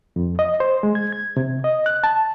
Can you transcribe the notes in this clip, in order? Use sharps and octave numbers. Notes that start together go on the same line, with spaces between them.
F2
D#5
C5
G#3
G#6
G#6
C3
D#5
F#6
A5